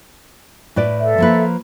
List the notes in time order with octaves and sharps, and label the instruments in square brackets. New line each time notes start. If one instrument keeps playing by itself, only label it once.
[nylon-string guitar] A2 B4 D5
[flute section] A4 E5
[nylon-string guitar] F3 A#3 B4